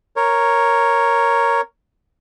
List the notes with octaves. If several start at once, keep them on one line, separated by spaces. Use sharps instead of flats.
A#4 C#5